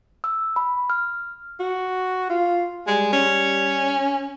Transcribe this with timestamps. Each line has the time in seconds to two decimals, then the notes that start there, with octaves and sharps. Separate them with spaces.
0.24 E6
0.56 B5
0.90 F6
1.60 F#4
2.29 F4
2.87 G3 G#3
3.13 C#4